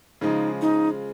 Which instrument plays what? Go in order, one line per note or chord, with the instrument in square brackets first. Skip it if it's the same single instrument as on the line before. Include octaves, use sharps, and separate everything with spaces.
[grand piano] C#3 F3 G#3 [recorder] D#4
[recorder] D#4